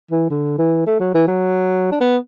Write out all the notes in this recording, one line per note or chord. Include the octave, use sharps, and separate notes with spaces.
E3
D3
E3
A3
F#3
E3
F#3
D4
B3